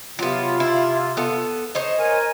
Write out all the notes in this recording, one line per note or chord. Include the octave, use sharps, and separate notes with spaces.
C3 F#3 B3 F4
E4
B3 A4
D#4 C5 C#5
A#4 G#5